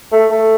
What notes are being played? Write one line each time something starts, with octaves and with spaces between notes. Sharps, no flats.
A3
A3